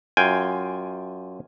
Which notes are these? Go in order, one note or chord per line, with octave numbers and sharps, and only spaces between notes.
F#2 F4 G5 G#5